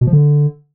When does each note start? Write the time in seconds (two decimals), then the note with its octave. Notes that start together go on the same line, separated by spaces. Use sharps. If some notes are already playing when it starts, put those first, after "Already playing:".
0.01 B2
0.07 F3
0.13 D3